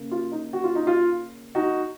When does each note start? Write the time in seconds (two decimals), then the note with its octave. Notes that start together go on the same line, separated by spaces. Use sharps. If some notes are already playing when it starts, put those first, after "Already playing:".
Already playing: C#3 A#3
0.11 F4
0.32 D#4
0.53 F#4
0.64 F4
0.75 D#4
0.87 F4
1.55 D#4 F#4